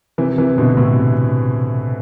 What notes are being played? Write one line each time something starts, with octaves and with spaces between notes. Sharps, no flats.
C3 E3
C3 E3
B2 D3
A2 C3